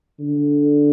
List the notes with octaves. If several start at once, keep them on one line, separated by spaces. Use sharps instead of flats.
D3